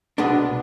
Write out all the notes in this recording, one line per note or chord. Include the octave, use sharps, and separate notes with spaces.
C2 B2 G#3 B3 D4